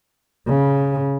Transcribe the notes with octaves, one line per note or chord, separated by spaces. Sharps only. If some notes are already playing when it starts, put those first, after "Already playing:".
C#3